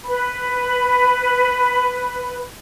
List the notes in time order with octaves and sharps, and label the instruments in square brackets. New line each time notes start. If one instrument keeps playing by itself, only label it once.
[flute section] B4 B5